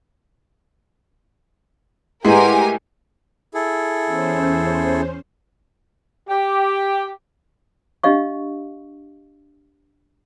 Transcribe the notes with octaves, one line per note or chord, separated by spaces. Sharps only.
A2 G#3 G4 A#4 B4 F#5 G#5 C6
E4 G#4 A4
E2 C#4 C5
G4
D4 G4 D#5 F5 C#6